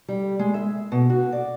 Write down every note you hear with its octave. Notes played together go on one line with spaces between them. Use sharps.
G3
G#3
E5
B2
F#4
D5